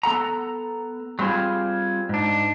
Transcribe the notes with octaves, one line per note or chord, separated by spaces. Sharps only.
B3 A4 F#5 A#5
F#3 G3 C4 F4 G#4
G#2 D4